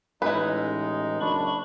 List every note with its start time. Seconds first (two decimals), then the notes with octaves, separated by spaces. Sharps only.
0.22 A1 G#3 D#4 E4 B4
1.20 F#1 D4 B5 C#6